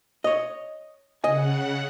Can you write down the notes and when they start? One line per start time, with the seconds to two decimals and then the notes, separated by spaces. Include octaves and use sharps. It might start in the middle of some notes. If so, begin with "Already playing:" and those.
0.24 C#5 D#5
1.24 C#3 D#5 F#5 G#5